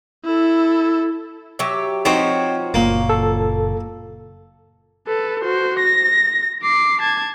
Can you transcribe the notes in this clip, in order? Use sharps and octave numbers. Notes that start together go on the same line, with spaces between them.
E4 A4
F#3 G4 E5
F3 C4 D#4 F#4 C#5
F#1 A#2 A#3
A4
A4 B4
F#4 C5
A#6
D6 C7
A5 G#6